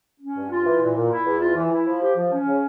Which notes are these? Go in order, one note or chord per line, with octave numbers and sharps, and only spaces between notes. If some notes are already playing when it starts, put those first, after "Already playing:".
C#4
G2
F4
E3
A#2
A#2
E4
E2
F4
E3
E4
F3
G4
F3
C#4
C#3